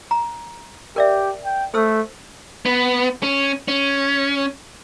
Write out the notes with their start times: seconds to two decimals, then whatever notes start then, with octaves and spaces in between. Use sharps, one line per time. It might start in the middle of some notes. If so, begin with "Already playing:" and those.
0.11 A#5
0.96 G4 A#4 D5 E5
1.45 G5
1.74 A3 A4 C5 E6
2.66 B3
3.23 C#4
3.68 C#4